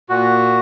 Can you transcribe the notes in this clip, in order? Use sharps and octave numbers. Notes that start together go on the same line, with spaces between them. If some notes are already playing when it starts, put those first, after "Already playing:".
A#2 F#4